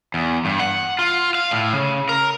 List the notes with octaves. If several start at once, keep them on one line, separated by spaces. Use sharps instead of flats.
E2
G2
F#5
F4
F5
A2
C#3
A#4